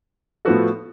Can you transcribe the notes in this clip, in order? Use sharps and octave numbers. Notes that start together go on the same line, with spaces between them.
A2 F3 B3 F#4 A4